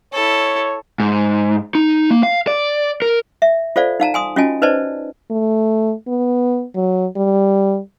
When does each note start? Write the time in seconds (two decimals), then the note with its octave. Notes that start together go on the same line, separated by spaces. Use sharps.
0.13 E4 A4 C#5
1.00 G#2
1.75 D#4
2.11 A#3
2.23 F5
2.47 D5
3.02 A#4
3.42 E5
3.76 F4 A4 C5 D5 F5
4.00 D#4 F5 A5 A#5
4.14 G#5 C6 D#6
4.36 C#4 F4 F#4 D#5 G#5 A5
4.62 D#4 B4 C5 D5 D#5 A5
5.30 A3
6.08 B3
6.75 F#3
7.16 G3